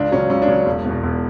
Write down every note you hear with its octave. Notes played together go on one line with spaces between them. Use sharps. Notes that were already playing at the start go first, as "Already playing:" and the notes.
Already playing: C#2 D4
C#3 F#3 C#4
C#2 C#4
D4
C#3 F#3
E1
E2 B2
E1